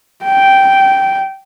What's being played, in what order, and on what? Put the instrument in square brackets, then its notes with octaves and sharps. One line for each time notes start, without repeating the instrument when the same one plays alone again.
[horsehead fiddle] G5